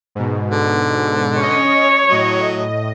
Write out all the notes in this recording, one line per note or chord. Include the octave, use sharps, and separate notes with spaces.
G#2 B2
D3
C#4 C#5 D#5
A2 F#3 D#5